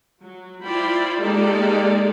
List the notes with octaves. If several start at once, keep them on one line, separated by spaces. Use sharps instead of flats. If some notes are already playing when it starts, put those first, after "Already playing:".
F#3
E4 F4 C5 D5 G5 B5
G#3 A#3 D#4 G4 A4 D5